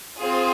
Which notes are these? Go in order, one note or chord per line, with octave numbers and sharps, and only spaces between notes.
C4 F4 G#4